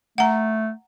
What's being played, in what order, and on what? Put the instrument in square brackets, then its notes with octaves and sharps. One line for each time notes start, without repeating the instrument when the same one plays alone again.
[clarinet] A3 [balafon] F#5 A#5